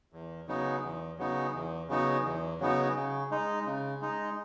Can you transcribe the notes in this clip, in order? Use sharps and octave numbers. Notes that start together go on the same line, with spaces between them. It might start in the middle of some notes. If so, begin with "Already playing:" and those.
E2
C#3 F#3 B3 D#4
E2
C#3 F#3 B3 D#4
E2
C#3 F#3 B3 D#4
E2
C#3 F#3 B3 D#4
C#3
G#3 D#4
C#3
G#3 D#4